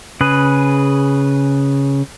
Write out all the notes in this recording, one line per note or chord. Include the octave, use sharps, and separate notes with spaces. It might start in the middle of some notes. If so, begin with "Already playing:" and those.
C#3 G#4 B4